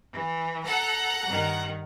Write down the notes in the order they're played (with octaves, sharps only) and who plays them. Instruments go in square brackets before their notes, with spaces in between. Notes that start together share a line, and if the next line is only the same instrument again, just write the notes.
[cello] E3
[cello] A4 [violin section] F#5 A#5
[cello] G2 D#3